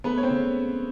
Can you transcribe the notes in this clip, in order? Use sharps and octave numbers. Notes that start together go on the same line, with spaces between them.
A3 B3 B4
C#5
C4 C5
C#3